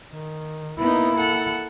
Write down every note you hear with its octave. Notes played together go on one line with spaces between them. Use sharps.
D#3
A#3 B3 D#4 E4
A4 F#5